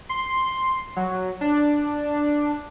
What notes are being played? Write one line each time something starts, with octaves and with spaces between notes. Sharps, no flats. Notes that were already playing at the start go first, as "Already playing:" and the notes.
C6
F#3
D4